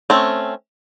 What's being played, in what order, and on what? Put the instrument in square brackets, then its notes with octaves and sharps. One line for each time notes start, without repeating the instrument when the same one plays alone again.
[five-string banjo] A3 C4 C#4